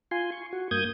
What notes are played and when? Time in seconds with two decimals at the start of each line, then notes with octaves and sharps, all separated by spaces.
0.11 F4 G#5 C6
0.32 C#6
0.53 F#4
0.71 G2 A#3 D#6 G6 G#6